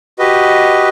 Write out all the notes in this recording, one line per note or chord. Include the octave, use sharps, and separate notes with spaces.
F#4 G4 B4 D#5